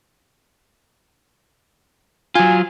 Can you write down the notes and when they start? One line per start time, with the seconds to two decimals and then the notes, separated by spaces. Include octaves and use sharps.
2.35 F#3 F4 G#5